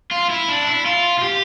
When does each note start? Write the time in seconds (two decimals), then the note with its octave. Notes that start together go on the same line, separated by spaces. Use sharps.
0.11 F4
0.30 E4
0.48 D4
0.67 E4
0.86 F4
1.19 F4
1.24 G4